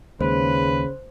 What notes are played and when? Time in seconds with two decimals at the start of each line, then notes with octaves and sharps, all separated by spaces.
0.21 D#2 C#3 G#3 B4 C5